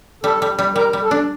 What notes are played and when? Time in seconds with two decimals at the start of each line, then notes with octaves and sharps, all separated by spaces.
0.24 G3 A4
0.42 G3
0.59 G3
0.76 G3 A#4
0.93 G3
1.02 A4
1.11 D4